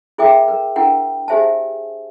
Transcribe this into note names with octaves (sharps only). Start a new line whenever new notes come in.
E4 G#4 A#4 E5 G5 D6
A#4
D4 E4 A#4 F#5 G5
G4 G#4 C5 E5 G#5 A5